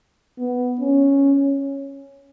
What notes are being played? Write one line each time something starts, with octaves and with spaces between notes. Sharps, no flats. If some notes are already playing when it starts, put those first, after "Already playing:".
B3
C#4